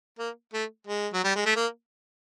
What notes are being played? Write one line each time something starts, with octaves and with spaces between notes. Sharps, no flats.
A#3
A3
G#3
F#3
G3
G#3
A3
A#3